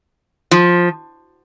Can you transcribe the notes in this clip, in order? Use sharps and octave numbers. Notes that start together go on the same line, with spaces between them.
F3